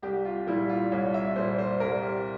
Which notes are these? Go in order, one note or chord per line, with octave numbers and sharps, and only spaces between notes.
C2 G4
F4
A#2 G3 E4
F4
C2 C#5
E5
A#2 G3 C5
C5
C2 A#4
G4